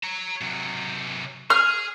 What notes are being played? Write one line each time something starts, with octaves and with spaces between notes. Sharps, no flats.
C#5 A#5
C3 F#3
G#4 F6